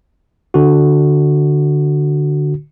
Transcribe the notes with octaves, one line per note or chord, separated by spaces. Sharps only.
D3 F#4